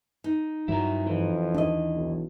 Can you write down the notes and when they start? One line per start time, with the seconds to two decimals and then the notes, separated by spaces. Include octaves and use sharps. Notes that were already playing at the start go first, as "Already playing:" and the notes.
0.24 D#4
0.68 G2 F#3 E4 A#4
1.06 F2 E3
1.54 D#2 D4 D#5
1.94 B1